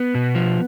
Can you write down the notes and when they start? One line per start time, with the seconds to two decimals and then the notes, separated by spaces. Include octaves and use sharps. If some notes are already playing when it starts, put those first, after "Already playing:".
Already playing: B3
0.15 B2
0.35 F3